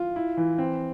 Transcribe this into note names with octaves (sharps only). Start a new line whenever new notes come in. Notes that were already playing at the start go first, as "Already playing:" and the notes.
Already playing: F4
E4
E3
C4